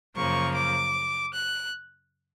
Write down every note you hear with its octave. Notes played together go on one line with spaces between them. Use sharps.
F#2 C#3 F3 A#3 C#6
D6
F#6